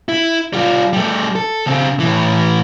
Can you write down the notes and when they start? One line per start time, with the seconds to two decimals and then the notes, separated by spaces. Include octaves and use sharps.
0.09 E4
0.53 G3 F4
0.93 G3 A3
1.36 A4
1.67 C#3 C4
2.00 A2 E3